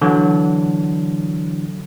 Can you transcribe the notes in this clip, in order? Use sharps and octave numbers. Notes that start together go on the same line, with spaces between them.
D3 E3 F#3